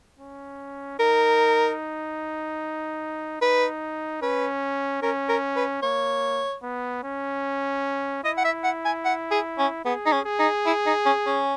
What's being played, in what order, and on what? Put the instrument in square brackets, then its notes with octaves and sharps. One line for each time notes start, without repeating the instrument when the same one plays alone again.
[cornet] C#4
[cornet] D#4 [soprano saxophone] A#4
[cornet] D#4 [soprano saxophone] B4
[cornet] C#4 [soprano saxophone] B4
[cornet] C#4 [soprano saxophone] A#4
[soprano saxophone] A#4
B4
[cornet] A#3 [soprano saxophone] C#5
[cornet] B3
C#4
[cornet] E4 [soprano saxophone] D#5
[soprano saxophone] F#5
E5
F#5
G#5
F#5
G#4
C#4
[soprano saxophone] B3 [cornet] G#4
[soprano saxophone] D#4
C#4
[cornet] G#4
[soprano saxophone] D#4
E4
D#4
C#4
C#4